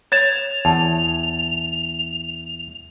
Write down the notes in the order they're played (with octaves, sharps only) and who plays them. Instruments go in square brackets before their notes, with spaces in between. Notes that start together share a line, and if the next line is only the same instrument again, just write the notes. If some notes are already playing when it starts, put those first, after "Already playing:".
[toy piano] C#5 [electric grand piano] G#6 A6 E7 [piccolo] F7
[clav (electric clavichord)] E2 [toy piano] A5